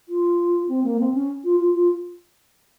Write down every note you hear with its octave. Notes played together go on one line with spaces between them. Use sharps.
F4
C4
A#3
C4
C#4
F4
F4
F4